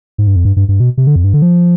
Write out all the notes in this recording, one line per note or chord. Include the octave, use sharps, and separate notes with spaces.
G#2
G2
F2
G2
G2
G2
B2
C3
D3
F2
G2
D3
F3